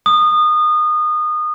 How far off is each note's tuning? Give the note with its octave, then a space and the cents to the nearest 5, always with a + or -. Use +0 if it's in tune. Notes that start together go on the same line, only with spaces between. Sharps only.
D#6 -25